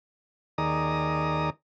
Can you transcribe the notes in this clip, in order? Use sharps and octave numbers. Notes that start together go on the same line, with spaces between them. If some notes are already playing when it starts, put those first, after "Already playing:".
D#2 D#3 G#4 D5 A#5 D#6